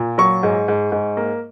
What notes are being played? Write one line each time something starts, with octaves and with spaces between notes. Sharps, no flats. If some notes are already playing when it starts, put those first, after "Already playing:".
Already playing: A#2
F#3 C#6
G#2
G#2
G#2
A#3